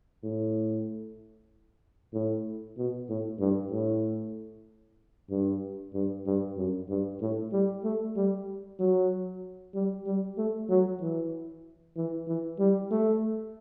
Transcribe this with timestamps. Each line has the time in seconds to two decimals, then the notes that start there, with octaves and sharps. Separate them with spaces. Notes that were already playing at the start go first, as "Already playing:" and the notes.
0.23 A2
2.14 A2
2.77 B2
3.09 A2
3.40 G2
3.72 A2
5.30 G2
5.94 G2
6.26 G2
6.57 F#2
6.89 G2
7.21 A2
7.52 G3
7.84 A3
8.16 G3
8.79 F#3
9.74 G3
10.06 G3
10.38 A3
10.70 F#3
11.01 E3
11.97 E3
12.28 E3
12.59 G3
12.91 A3